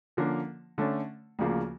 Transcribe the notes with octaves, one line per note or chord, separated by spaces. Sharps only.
D3 F3 A#3 C#4
D3 A3 C#4
D2 C#3 F3 A#3